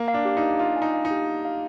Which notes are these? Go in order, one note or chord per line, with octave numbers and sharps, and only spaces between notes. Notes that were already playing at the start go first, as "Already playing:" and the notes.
Already playing: A#3
F5
D4
G4
D#4
F5
F4 D5
G#5
D#4
F5
D#4
G4
G4
F5